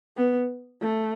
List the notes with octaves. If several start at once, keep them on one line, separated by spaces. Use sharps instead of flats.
B3
A3